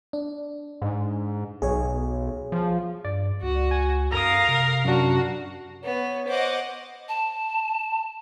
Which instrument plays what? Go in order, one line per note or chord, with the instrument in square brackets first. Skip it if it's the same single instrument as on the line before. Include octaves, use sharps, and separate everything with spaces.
[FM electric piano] D4
[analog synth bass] G#2
[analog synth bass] B1 [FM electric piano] G#4 C#5
[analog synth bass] F3
[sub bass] G2 [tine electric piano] D5
[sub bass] C#2 [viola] F#4
[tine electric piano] G#5
[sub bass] F#2 [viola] A#4 F5 [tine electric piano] A#5 D#6
[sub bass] C3
[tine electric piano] F#2 D4 [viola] F#4
[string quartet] B3 [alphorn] C#5
[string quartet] C5 [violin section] D#5 F#5 D6
[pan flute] A5